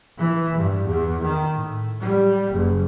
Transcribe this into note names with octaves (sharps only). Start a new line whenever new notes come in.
E3
G2
E2
D#3
A2
G3
F#1